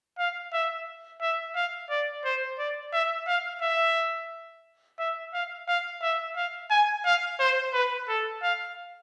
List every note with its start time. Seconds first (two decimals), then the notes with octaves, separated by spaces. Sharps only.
0.19 F5
0.53 E5
1.21 E5
1.56 F5
1.90 D5
2.25 C5
2.59 D5
2.93 E5
3.27 F5
3.62 E5
4.99 E5
5.33 F5
5.68 F5
6.02 E5
6.36 F5
6.70 G#5
7.05 F5
7.40 C5
7.73 B4
8.08 A4
8.43 F5